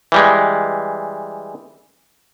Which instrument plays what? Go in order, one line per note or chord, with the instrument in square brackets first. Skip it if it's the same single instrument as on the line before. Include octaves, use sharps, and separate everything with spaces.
[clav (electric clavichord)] E3 G3 G#3